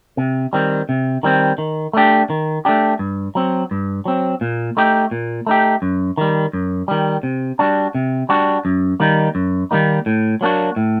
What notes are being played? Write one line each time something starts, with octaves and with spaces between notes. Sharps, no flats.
C3
D#3 G3 C4
C3
D#3 G3 C4
D#3
A3 D4 G4
D#3
A3 D4 G4
G2
F#3 C4
G2
F#3 C4
A#2
A3 D#4 G4
A#2
A3 D#4 G4
F#2
D#3 G3
F#2
D#3 G3
C3
G3 D4 F#4
C3
G3 D4 F#4
F#2
D#3 G3 A#3 D#4
F#2
D#3 G3 A#3 D#4
A2
F#3 A#3 D4 F#4
A2